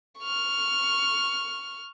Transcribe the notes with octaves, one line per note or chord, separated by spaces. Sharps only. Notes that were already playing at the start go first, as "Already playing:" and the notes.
C#6 F6